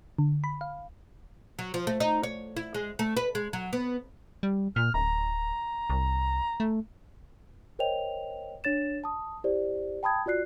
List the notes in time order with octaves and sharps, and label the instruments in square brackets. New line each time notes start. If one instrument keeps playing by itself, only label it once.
[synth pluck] D3
B5
F5
[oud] F#3
F3
A3
D#4
C#5
E4
G#3
A3
B4
G#3
F#3
B3
[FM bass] G3
[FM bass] A#2 [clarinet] F6
[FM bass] D1 [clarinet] A#5
[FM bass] C2
A3
[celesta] A#4 C5 C#5 D#5 G5 F7
D4 C#5 A6 E7
A5 D#6
E4 G4 C5 D5
G5 A5 B5 D#6 G#6
F4 F#4 D5 F#6 C7